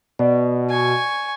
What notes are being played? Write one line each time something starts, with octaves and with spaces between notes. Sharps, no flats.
B2 D5
G#5 C#6